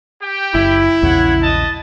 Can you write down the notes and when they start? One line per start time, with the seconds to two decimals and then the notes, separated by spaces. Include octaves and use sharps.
0.21 G4 G5
0.55 F#1 E4
1.02 A#1 E2 C#3 C#5 F#5
1.40 D#5 A5